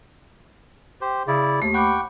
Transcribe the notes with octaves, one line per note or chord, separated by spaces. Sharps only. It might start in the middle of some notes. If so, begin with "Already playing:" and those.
G4 C5
C#3 E4 D5
D#2 A3
F#5 G5 B5 C#6 D6